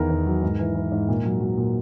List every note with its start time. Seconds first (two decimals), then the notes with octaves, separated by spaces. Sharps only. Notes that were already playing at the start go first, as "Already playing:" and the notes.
Already playing: E2 D#3 A#4
0.10 E2
0.26 F#3
0.42 G#2
0.59 E3
0.75 E3
0.92 G#2
1.08 A#2
1.25 F#3
1.41 F#3
1.57 A#2